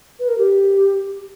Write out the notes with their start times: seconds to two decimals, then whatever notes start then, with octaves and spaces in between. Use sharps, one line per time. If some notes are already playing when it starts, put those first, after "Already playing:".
0.20 B4
0.28 A#4
0.38 G4